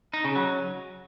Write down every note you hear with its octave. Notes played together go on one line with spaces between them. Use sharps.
D#4
C#3
F#3